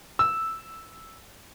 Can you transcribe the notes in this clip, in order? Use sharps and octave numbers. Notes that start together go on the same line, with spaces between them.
E6